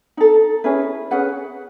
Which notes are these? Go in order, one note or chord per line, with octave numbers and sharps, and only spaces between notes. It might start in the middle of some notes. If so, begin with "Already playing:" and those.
D#4 A4
C#4 E4 G#4 B4
C#4 G#4 B4 F#5